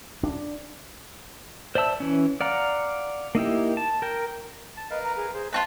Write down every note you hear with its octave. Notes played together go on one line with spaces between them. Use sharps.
D4
C5 D5 E5 A5 E6
E3 C#4
D5 F5 F#5 A#5
A#3 D#4 E4 G4
A5
A#4 G5
A5
A#4 B4 D#5 F5
A#5
G#4
G#4 C5
G#3 F4 F#4 B4 C5 A5